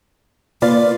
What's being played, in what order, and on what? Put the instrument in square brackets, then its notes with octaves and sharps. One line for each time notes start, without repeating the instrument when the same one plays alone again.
[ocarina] A#3 [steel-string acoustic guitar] F4 B4 D5